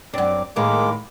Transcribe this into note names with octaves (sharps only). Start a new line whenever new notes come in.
F#2 C4 D4 D6
A2 D#3 G#3 A#3 D6